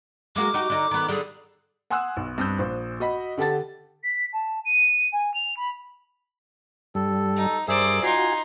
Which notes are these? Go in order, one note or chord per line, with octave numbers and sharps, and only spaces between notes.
G#3 A#3 F#4 D6
D#4 F#4 G4
D3 D#4
D#3 B3
D3 G3 G#4
F#5 G#5 C6 D#6 E6 F#6
B1
G2 C4 D#6 E6 G6
A#1 C5
F#4 D#5 B5
D3 G4 A4 F#5 A5 A6
B6
A5
D#7
G#5
F7
B5
G2 G3 A4
D#4
G2 G#4 A#4 C5 D5 E5
D#4 F4 F#4 G#5 C6